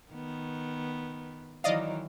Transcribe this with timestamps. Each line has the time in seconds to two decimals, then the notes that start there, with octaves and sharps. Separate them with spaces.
0.12 D#3 B3
1.64 D#3 E3 F#3 D5 D#5 F5